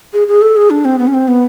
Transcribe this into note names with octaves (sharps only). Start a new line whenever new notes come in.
G#4
G#4
A4
G#4
D4
C4
B3
C#4
C4
B3